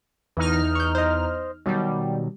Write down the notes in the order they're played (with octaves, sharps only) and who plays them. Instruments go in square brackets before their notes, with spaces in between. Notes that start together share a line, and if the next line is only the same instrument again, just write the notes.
[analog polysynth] E2 D#4 F6 [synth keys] E3
[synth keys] C#6 G6
C5 D#5
[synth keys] B2 D#3 F#3 [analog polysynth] G3